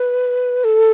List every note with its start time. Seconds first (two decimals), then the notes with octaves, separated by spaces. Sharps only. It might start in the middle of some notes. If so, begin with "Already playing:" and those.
Already playing: B4
0.64 A4